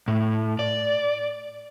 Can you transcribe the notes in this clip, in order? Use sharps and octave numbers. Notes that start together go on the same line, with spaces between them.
A2
D5